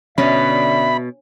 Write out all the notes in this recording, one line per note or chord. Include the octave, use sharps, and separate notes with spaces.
B2 D3 C#4 D5 E5 B5